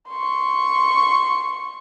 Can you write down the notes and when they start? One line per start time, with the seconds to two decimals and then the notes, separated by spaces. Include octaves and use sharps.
0.10 C6 C#6